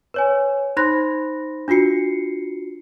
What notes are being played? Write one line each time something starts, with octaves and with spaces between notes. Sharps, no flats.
B4 C#5 G#5
D#4 C5 B5 C6 F#6 A#6
D4 F4 F#4 C7 C#7